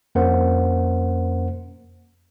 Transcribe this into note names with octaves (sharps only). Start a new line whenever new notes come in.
F2 A#3 C#4 A#4 C5 F#5